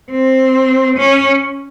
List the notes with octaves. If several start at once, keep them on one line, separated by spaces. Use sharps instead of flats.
C4
C#4